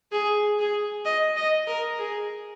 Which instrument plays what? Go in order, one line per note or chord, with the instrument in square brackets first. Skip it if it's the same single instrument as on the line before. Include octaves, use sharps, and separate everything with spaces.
[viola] G#4
G#4
D#5
D#5
A#4
G#4